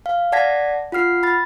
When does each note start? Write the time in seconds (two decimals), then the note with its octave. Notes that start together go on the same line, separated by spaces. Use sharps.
0.06 F5
0.32 D5 F#5 A5 G#6 A#6 B6
0.92 F4 F#5 F6 C7
1.23 B5 A6